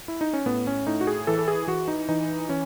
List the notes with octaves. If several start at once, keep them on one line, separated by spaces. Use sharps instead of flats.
E4
D#4
C#4
A2 B3
C#4
A2 D#4
F#4
G#4
E3 A4
A4
G#4
E3 F#4
D#4
E3 D#4
E3 C#4